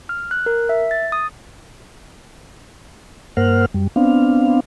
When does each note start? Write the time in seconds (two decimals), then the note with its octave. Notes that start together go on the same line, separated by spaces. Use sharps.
0.09 F6
0.31 F#6
0.46 A#4
0.69 E5
0.91 A6
1.12 D#6
3.37 G2 A#3 A#4 C5 F#5 F6
3.74 F#2 G3
3.96 B3 C4 D4 F5